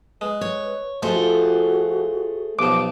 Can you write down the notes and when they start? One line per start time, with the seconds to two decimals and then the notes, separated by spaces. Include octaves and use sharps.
0.21 G#3 B4
0.41 C#5
1.03 F2 A3 F#4 G#4 C5
1.16 F4
2.59 B1 F3 G4 D6